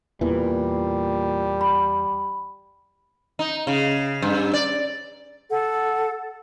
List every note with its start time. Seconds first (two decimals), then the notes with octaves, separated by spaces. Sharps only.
0.21 E2 A#2 E3 G3
1.61 B5
3.39 D#4
3.67 C#3
4.22 G2
4.54 D5
5.50 A4 F#5